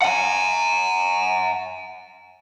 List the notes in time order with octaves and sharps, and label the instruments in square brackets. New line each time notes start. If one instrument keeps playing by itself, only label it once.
[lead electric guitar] F#5 G#5